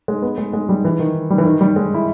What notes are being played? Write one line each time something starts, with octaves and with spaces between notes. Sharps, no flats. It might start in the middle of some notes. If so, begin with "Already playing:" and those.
G#3
B3
G#3
G#3
G3
E3
D#3
G3
E3
D#3
G3
G#3
E4